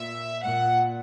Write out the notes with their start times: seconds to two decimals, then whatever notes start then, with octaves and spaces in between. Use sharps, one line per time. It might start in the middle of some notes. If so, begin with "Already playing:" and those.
Already playing: A#2 E5
0.44 A#2 F#5